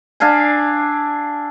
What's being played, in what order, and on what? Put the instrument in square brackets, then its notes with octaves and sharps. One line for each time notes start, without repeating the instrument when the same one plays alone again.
[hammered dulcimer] D4 E5 F5 G#5